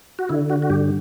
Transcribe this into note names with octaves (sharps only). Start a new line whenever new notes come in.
F#4
D3 E4
F#4
F#4
G2 G4